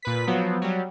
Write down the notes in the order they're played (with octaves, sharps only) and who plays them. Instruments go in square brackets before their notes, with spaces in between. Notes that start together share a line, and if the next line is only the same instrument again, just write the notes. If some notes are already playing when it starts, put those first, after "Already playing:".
[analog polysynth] A#2 B4 B6
F3 F#3 B3
F#3 G3